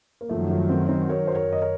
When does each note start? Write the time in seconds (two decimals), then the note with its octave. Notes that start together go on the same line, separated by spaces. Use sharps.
0.21 A#3
0.29 F#2 D#3 F3 F#3 A3
0.50 F3 A3
0.69 A3 C4
0.89 C4 D#4
1.09 A#4 C#5
1.27 C5
1.34 A#4 C#5
1.53 D#5
1.61 A#4 C#5